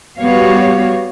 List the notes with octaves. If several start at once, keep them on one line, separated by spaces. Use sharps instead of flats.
G3 B3 F#4 G4 C#5 F5